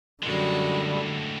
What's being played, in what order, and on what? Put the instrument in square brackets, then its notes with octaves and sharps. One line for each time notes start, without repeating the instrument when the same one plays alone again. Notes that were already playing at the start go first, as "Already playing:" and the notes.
[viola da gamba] F#2 F#4 [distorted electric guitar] A2 G#3 [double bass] D3 [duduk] G3